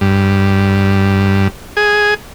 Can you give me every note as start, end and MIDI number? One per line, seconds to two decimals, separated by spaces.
0.01 1.48 43
1.77 2.14 68